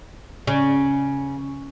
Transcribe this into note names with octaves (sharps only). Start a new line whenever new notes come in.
C#3